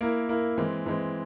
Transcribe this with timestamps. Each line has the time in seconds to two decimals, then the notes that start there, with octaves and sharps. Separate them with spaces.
0.01 A#3 E4 A#4
0.29 A#3 E4 A#4
0.58 E3 G#3 C4
0.86 E3 G#3 C4